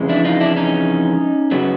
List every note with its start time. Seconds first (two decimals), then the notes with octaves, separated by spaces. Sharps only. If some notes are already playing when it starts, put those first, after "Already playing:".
Already playing: F2 C#3 E3 G#3
0.09 D4 E4
0.25 D#4 F4
0.40 D4 E4
0.56 C#4 D#4
1.51 F#2 C#3 F#3 B3